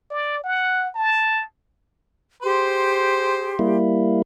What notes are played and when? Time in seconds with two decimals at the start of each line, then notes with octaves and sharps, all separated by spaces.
0.11 D5
0.44 F#5
0.95 A5
2.43 G4 G#4 C5 C6
3.59 G3 A#3 E4